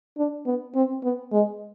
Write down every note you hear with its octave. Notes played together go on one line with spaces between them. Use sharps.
D4
B3
C4
B3
G#3